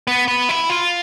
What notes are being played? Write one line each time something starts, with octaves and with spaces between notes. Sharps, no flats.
B3
B3
E4
F4